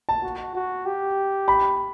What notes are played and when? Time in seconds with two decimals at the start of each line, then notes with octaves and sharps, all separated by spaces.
0.09 A5
0.23 F#4
0.55 F#4
0.86 G4
1.48 B5